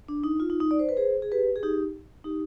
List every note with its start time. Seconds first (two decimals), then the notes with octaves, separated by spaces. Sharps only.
0.08 D4
0.24 D#4
0.40 F4
0.50 D#4
0.60 D#4
0.71 D5
0.79 C5
0.89 B4
0.97 G#4 C5
1.22 G#4
1.32 G4 B4
1.56 G#4
1.63 D#4 G4
2.24 D#4 G4